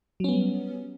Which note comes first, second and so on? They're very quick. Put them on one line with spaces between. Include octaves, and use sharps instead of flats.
F#3 C#4 B3 G3